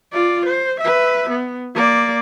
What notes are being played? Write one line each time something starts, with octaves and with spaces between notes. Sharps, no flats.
F4 D5
C5
B4 E5
B3
A#3 D5